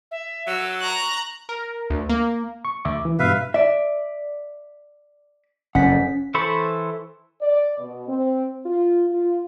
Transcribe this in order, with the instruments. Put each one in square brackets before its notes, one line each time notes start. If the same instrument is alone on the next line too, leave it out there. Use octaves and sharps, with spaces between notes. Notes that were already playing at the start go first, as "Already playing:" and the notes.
[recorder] E5
[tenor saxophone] F#3 [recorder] E6
[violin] A#5 F#6 [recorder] C#6
[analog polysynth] A#4
D2
A#3
[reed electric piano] C#6
D2 E5 D6
E3
[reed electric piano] G2 B2 [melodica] B4 E5 F5
[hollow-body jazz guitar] D5 E5
[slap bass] F#1 F2 [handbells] C#4 B6 [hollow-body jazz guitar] F#5
[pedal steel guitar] E3 A4 C5 B5 C#6
[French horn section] D5
B2
C4
F4
F4